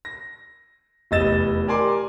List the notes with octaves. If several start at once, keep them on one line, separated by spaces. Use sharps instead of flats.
A#6
F1 E2 D#5 E6 A6 E7
G4 A#4 D5 G#5 C6 D6